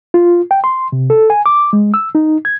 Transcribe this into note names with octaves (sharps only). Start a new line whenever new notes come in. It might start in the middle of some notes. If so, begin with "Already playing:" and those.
F4
G5
C6
C3
A4
G#5
D6
G#3
E6
D#4
G#6